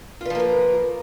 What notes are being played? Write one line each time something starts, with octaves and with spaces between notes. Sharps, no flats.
F3 A#3 F4 A#4 B4